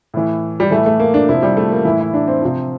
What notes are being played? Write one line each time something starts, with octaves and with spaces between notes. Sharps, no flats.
A2 E3
G3
A2 E3 A3
A3
A#3
D4
C3 F3 E4
G3
A3
A#3
A2 E3 E4
E4
D4
C4
C3 F3